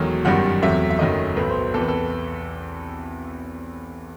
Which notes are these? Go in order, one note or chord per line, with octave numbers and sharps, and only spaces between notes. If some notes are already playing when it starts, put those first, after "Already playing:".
Already playing: E1 E2 D#3 F#3 A3
G1 F#2 D#3 G3 F#5
E2 C3 F#3 A3 E5
E5
F#1 F#2 D#3 F#3 A3 D#5
B1 A2 F#3 A3 B4
C5
E2 C3 E3 A4
B4
A4